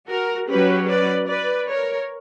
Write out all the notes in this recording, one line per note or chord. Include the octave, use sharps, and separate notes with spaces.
F#4 A#4
F#3 C#4 G4 B4
B4 D5
B4 D5
A#4 C#5